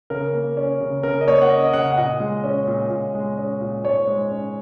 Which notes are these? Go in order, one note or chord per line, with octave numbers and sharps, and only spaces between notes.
C#3 A#4
A#3
C#4
C#3
C#3 A#4
D#5
A#3 C#5
F#5
C#4 D#5
D#5
C#3 F#5
F#5
A#2 D#5
G#3
C#4
A#2
A#2
G#3
C#4
A#2
G#2 C#5
G#3
C#4